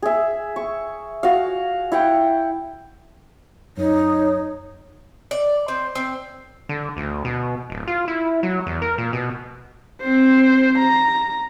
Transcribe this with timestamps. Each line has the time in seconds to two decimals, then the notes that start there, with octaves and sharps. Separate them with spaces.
0.02 G#4 E5
0.56 C#6
1.23 F#4 F5
1.92 E4 F#5 G5
3.77 F#2 D#4 C#5
5.31 D5
5.68 C4
5.95 C4
6.69 D3
6.97 D2
7.25 B2
7.70 D1
7.88 F4
8.08 E4
8.43 F#3
8.67 E2
8.82 A#4
8.98 A#2
9.13 B2
10.02 C4 C5
10.79 A#5